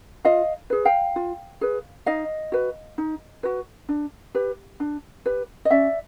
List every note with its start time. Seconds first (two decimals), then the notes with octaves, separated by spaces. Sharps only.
0.25 F4 D#5 F5
0.70 G#4 B4
0.85 F5 G5
1.16 F4
1.61 G#4 B4
2.06 D#4 D#5 F5
2.52 F#4 B4
2.98 D#4
3.43 F#4 B4
3.89 D4
4.35 G4 B4
4.80 D4
5.26 G4 B4
5.65 D#5
5.70 C#4 D5 E5